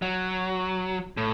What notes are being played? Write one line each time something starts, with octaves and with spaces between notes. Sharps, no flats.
F#3
A2